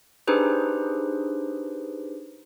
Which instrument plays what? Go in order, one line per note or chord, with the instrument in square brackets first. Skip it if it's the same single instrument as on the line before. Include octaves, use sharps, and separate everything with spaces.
[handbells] D4 D#4 G4 G#4 B4 C5